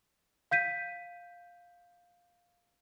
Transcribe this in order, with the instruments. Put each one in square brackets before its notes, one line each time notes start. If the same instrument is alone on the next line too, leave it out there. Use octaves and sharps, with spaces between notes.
[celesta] F5 G6 B6 D#7